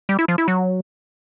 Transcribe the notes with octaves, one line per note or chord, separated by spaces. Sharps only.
G3
E4
F3
E4
F#3